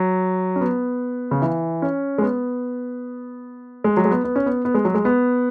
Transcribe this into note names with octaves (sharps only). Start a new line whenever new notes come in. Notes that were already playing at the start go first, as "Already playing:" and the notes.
Already playing: F#3
C#4
B3
C#3
E3
C#4
G#3
B3
G#3
F#3
G#3
B3
B3
C#4
B3
B3
G#3
F#3
G#3
B3